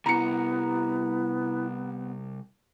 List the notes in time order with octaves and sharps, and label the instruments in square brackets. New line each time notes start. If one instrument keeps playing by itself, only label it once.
[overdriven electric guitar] C2 [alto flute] B3 [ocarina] E4 [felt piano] A#5 C#7